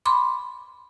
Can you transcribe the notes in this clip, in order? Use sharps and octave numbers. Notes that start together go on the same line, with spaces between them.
B5 C6 D6